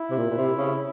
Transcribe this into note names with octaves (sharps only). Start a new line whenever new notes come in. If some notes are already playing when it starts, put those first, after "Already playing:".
Already playing: E4
C3
A#2
A#2
C3
C#3